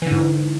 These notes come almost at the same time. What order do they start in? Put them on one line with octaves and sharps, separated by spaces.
E3 D3 G#2